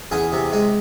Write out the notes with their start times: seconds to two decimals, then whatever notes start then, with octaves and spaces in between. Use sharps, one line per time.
0.11 E2 G#4
0.32 C3
0.53 G#3